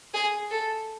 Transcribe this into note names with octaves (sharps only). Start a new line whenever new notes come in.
G#4
A4